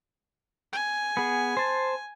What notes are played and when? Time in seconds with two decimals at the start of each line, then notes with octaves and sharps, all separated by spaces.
0.73 G#5
1.17 B3 G#4
1.57 C5 A5